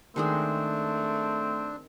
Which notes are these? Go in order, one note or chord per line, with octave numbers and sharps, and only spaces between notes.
D#3 G#3 A3 C4 D4 G#4